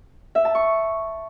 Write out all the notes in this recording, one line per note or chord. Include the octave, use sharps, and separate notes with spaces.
E5
A5
C#6